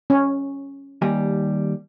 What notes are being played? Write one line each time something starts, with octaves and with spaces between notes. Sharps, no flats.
C#4
D#2 G3 G#5